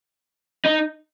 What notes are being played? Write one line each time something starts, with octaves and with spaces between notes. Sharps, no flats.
D#4